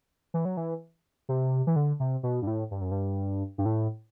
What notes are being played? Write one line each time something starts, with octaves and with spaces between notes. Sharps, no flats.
E3
F#3
E3
C3
E3
D3
C3
B2
G2
A2
G2
F#2
G2
G2
A2